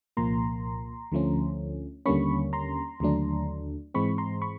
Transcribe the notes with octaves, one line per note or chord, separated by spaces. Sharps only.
C2 A#2 F3 A#3 A#5 C6
D2 D3 F3 A3 C#4
D#2 D3 G3 A#3 C#4 B5 C#6
A#5 C6
D#2 D3 F#3 A3 D4
G#2 E3 G#3 C4 B5 C#6
A#5 C6
B5 C#6